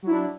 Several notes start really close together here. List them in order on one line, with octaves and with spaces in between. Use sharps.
F#3 E4 D4